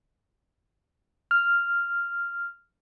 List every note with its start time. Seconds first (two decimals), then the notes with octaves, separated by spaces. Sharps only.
1.31 F6